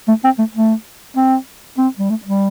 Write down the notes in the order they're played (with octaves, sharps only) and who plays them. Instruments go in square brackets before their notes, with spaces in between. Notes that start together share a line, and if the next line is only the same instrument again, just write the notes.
[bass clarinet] A3
C4
A3
A3
C4
C4
G3
A3
G3